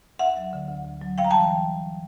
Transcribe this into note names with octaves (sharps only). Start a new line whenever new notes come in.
D2 E5 F#5
F#3
D3
D2
D2
F#3
G3 F5 G5
A#5
G5 A5
E3